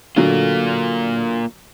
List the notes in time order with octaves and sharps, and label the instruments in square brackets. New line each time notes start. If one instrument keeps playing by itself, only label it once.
[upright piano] D3 F#3 A3 [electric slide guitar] A#3 F4